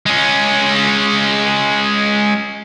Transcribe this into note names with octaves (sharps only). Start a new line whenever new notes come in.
G#3 C#4